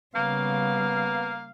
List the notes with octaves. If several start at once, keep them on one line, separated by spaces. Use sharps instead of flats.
C#3 G3 A#3 B3 F5